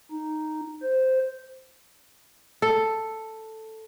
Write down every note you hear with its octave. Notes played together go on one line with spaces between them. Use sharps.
D#4
C5
A4